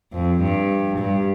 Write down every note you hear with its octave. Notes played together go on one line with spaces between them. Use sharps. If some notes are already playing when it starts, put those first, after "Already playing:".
F2
G2
G2